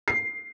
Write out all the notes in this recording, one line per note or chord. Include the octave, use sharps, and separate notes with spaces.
C7